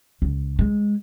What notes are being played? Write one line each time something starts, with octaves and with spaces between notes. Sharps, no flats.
C#2
G#3